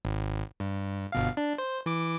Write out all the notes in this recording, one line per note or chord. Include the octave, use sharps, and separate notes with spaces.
G#1
G2
G1 B2 F5
D4
C5
E3 D6